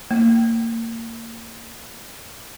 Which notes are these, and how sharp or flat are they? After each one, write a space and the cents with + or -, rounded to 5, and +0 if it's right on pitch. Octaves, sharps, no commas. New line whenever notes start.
A#3 -30